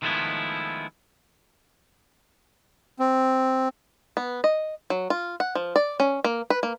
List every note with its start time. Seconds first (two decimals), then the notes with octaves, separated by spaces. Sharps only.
0.02 D#3 F3 G#3 A3 B3 E4
2.99 C4
4.17 B3
4.44 D#5
4.90 F#3
5.10 F4
5.40 F#5
5.55 F3
5.76 D5
6.00 C#4
6.24 A#3
6.50 B4
6.63 A#3